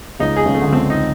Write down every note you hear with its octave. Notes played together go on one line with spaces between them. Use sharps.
C#2 C#3 D#4
G#4
C#2 C#3
A3
D3
C#2 C#3 C4
D#4